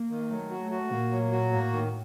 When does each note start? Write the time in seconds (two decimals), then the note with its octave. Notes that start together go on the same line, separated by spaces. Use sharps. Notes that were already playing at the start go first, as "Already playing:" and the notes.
Already playing: A#3
0.10 D#3
0.30 F#3 A3
0.51 F#4
0.61 A3
0.71 F#4
0.91 A#2 A#3
1.12 F#3
1.32 F#4
1.52 A2 A#3
1.73 D#3